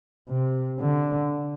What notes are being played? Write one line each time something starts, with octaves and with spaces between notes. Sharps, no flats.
C3
D3